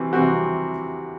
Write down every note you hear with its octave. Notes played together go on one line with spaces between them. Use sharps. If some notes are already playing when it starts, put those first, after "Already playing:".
Already playing: C3 E3 G3 C4 F#4
C3 E3 G3 C4 F#4